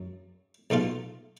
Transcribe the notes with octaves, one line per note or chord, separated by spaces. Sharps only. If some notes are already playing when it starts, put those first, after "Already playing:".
Already playing: F#2
B1 B2 A3 F4